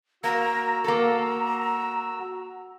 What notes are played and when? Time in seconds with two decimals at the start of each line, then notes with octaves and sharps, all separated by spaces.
0.24 A#3 F#4 A#5 E6
0.84 A#3 A4 A#5